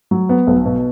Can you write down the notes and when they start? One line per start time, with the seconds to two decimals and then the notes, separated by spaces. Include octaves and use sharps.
0.11 F#3
0.29 B3
0.47 B1
0.65 B2